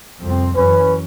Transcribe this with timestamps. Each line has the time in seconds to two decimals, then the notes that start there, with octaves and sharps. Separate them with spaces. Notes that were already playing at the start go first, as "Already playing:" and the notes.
0.19 C2 F2 C4
0.56 F#2 E3 C#4 B4